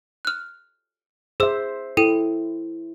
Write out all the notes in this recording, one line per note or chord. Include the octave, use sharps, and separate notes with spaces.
F6 F#6
G#4 C5 E5 E6
E4 A4 G5 D#7